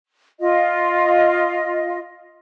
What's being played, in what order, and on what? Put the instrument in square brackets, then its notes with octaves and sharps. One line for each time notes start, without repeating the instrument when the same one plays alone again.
[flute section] F4 D#5